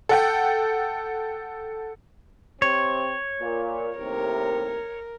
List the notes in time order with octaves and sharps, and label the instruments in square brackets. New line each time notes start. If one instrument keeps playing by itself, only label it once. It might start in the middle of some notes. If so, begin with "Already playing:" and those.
[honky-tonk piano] A4 F#5 G5
[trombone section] C3 C4 [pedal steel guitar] C#5
[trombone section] A#2
[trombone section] D#2 A2 C3 [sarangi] A#4